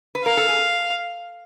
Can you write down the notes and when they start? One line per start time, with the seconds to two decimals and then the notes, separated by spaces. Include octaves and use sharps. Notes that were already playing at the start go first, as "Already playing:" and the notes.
0.15 B4
0.24 A#4 F5
0.37 A4
0.49 G#4